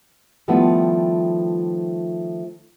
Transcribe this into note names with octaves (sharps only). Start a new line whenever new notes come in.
D#3 F3 G3 A3 B3 E4